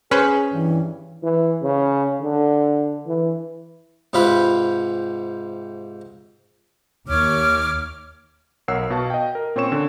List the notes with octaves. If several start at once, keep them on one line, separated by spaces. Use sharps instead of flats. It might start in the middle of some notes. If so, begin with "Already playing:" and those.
C#4 G#4 B4 C5
G2 E3
E3
C#3
D3
E3
G#2 C3 F4 G4 B4 B5
D#2 C#5 D6 F6
B1 A#4 C#5 F#5 E6 C7
B2 F#4 F5 A5
D#5 G5
A#4
A#2 C4 C#4 C#5 C#6 E7
D3